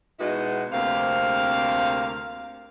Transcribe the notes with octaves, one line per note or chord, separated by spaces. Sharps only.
B2 G#3 B3 D#4 E4 F#4
D2 C3 A#3 C4 F5